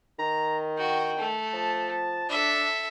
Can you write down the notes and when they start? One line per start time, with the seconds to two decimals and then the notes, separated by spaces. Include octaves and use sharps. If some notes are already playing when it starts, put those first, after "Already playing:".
0.19 D#3 A#5
0.78 F#4 G5
1.19 A3
1.53 F3 A5
2.29 D4 A4 E5